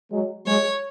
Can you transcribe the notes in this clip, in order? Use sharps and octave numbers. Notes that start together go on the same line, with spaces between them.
F#3 G#3
F#3 G#3 C#5